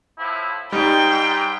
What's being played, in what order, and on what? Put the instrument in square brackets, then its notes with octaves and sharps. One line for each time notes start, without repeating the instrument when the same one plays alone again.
[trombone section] A2 F3 E4
[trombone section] G#2 [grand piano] G3 D#4 [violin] G5